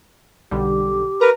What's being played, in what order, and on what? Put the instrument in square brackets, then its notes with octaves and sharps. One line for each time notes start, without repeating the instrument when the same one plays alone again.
[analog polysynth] B1 D3 G3 [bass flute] G4
[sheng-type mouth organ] A#4 B4 [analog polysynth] A#5